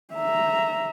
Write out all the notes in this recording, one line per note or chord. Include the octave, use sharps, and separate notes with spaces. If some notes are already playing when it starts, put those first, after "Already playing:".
E5 A#5